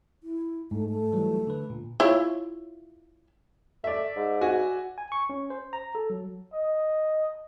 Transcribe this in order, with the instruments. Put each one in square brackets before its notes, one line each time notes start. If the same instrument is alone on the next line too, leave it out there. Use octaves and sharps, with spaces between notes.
[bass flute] E4
[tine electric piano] G#2 [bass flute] A3
[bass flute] A3
[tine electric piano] E3 F#3 G3
D3 B4
A#2
[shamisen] E4 F4 C#5
[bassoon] A3 [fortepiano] D5 E5
[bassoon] G#2
[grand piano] F#4 G#5
[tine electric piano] G#5
C#6
C#4
C5
A#5
A4
F#3
[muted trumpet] D#5